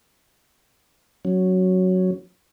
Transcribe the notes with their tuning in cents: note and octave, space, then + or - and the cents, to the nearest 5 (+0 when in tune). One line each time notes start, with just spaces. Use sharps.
F#3 +0 C#4 +0